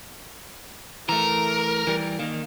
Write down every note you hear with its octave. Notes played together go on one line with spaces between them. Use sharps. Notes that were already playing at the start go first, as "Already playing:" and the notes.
E3 A3 A#4
E3 G3
D#3 A#3